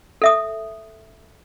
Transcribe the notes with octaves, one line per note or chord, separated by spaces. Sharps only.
A4 E5 D#6